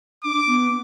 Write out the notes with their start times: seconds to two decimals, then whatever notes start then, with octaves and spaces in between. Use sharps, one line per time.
0.24 D4 D6
0.47 B3